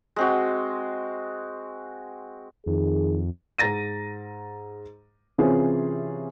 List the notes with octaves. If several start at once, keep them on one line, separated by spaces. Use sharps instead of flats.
G#3 C4 F#4
F2 D#3 G#4
G#2 A#5 A6 A#6 D#7
C3 E3 C4 C#4 F4 G#4